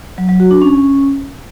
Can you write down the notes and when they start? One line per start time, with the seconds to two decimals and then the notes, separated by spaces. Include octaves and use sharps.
0.18 F#3
0.29 F#3
0.40 F#4
0.51 D4
0.62 C#4